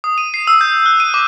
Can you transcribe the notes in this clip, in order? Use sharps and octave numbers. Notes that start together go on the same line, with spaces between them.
D#6
D#7
C7
E6
G6
F#6
D#7
D6